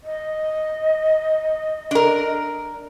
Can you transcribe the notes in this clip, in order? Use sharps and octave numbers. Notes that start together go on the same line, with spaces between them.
D#5
D4 A#4